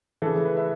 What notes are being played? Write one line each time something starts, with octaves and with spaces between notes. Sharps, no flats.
C#3 E3 A4
G#4
B4
E5